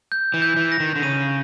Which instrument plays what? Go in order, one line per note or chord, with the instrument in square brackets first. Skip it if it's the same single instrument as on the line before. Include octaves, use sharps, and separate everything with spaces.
[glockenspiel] G6
[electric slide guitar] E3
[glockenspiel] G6
[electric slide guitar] E3
[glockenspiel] A#6
[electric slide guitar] D#3
D3
[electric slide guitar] C#3 [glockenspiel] D#7